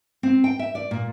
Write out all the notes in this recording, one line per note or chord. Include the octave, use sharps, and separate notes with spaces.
C4
G5
E5
D5
A#2